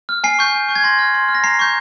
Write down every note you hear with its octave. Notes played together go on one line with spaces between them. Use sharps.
F6
G#5 C7
C#6 G6
G#5
C#6 G6
G#6
C6 A#6
F6
C6
F6
A#6
A#5 C7
C#6 G6